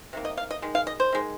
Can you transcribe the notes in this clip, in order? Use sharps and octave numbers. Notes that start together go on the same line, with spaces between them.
C3 D#3 A#3
D#5
F5
D#5
D#3 G#3
F5
D#5
C5
D#3 G#3